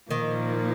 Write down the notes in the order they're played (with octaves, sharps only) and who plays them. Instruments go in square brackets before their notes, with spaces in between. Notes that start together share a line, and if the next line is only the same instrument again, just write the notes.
[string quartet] A#2 F3 A#3 [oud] D#3